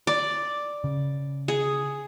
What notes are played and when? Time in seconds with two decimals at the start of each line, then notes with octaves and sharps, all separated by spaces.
0.07 D5
0.84 C#3
1.48 G#4